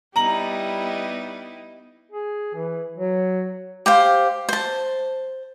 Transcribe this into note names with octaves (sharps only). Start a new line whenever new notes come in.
G3 B3 D#4 E4 A#5 F#7
G#4
E3
F#3
G4 C5 F5
C5 A5